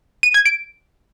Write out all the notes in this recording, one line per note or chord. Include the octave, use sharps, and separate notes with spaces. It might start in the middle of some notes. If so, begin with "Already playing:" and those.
D#7
G#6
D7